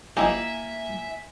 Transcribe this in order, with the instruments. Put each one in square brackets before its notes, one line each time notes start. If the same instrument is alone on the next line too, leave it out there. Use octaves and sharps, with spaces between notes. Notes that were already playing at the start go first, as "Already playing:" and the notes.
[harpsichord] F3 D#4 G4 [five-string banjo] A#3 E4 [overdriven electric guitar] E5 [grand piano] G#5